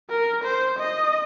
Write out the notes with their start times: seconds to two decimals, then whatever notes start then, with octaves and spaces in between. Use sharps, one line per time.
0.10 A#4
0.44 C5
0.79 D#5